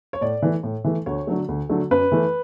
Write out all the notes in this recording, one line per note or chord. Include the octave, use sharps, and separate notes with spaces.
C#5
A2 D5
E3 A3
A2
E3 A3
D2 C#5
D3 F#3 A3
D2
D3 F#3 A3
F#2 B4
E3 A3